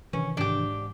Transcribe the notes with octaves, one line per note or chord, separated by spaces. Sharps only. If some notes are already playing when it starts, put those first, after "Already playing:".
C3 D#3 E3 C#4
G#2 D4 G4